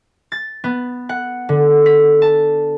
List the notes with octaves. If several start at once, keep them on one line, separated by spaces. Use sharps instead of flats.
A6
B3
F#5
D3
B6
A5